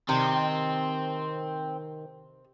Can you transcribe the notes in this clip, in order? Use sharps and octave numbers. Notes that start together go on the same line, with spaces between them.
C3 D#3 C4